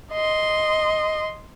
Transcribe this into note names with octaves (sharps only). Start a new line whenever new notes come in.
D#5 C6